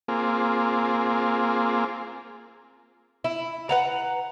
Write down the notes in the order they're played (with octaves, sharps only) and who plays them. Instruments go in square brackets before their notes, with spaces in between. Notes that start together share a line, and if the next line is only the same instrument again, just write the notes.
[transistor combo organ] A#3 C4 F4 G#4
[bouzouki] E4
B4 F#5 A#5